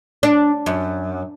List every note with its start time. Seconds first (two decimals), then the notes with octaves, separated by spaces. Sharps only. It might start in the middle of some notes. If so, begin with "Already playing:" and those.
0.23 D4
0.66 F#2